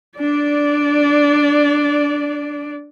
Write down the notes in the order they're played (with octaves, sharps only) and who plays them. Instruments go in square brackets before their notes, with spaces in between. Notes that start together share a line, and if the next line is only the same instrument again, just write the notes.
[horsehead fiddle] D4 D5